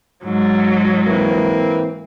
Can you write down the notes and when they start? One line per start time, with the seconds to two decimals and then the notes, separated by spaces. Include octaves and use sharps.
0.23 G#2 F#3
1.06 E3 A#3 C4